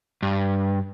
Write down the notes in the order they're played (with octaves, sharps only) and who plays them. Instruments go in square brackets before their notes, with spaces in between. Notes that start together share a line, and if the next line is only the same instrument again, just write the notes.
[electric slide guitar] G2